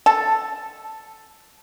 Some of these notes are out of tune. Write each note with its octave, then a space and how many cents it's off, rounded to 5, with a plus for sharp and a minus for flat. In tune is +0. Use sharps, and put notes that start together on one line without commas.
A4 +0 A5 +5